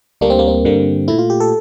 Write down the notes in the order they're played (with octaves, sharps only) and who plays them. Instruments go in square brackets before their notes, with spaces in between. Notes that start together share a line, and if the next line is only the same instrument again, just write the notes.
[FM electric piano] D2 D3 G3 A#3 D4
C4
A#3
C4
G2 D3 G3 A#3
A#2 A3 E4
F4
G4
A4